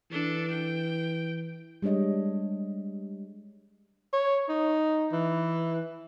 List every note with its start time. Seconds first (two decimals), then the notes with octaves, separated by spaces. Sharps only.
0.11 E3 D4 A4
0.50 G5
1.82 G3 G#3 D4 C#5 D#5
4.13 C#5
4.49 D#4
5.12 E3